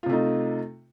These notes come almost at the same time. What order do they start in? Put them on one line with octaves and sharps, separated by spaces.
F4 C3 A3 D#4